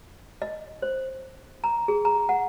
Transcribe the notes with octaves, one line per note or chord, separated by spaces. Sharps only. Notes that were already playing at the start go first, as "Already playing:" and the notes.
D#5
C5
A#5
G#4
A#5
F#5